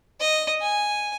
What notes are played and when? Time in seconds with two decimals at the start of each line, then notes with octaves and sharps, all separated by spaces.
0.21 D#5
0.62 G#5